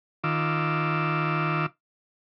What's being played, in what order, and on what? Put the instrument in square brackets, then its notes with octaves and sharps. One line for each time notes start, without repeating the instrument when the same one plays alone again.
[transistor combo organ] D#3 F4 D6 E6